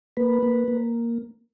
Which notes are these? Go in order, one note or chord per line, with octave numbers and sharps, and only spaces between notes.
A#3 B4
A#3
A#3